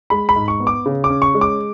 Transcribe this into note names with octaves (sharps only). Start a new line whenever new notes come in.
G#3 B5
B5
G#2
C#6
B3
D6
C#3
D6
C#4
C#6
G#3
D6